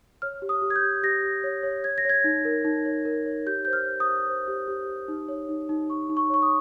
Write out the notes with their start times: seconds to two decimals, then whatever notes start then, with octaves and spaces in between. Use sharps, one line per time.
0.22 C#5 F6
0.42 G4
0.49 D#6
0.62 G4
0.70 G#6
0.76 G6
0.83 G4
1.03 G4 A#6
1.23 G4
1.44 C#5
1.63 C#5
1.84 C#5 G#6
1.98 A#6
2.05 C#5 G#6
2.24 D#4
2.45 A#4
2.65 D#4
2.85 C#5
3.05 A#4
3.26 C#5
3.46 G4 G6
3.65 C5 G6
3.73 F6
3.87 C5
4.00 D#6
4.07 G4
4.28 C5
4.48 G4
4.68 G4
4.87 G4
5.08 D#4
5.28 C#5
5.49 D#4
5.69 D#4
5.90 D#4 C#6
6.09 D#4
6.17 C#6
6.30 C#5 C#6
6.43 D#6